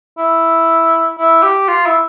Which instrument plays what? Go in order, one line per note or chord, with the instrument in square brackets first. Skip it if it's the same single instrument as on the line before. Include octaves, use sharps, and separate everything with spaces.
[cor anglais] E4
E4
G4
F4
E4